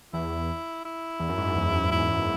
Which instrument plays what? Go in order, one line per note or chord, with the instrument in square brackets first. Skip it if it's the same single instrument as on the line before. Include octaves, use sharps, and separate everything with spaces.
[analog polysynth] E2 [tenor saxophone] E4
[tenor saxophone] E4
[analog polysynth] E2
F#2
G#2
F#2
E2
[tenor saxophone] E4